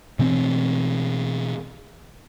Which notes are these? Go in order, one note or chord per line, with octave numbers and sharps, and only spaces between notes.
B2 E3 C4